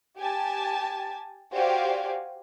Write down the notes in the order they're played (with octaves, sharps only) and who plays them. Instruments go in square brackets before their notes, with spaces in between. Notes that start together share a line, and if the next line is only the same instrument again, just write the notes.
[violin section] G4 G#5 A5
F#4 G4 C5 D5 F5 G#5